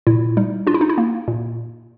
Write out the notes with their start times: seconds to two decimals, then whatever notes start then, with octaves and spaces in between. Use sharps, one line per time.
0.07 A#2 E4
0.37 G3 D#4
0.67 D4 F4
0.74 E4
0.81 D#4
0.89 E4
0.98 A#3
1.28 A#2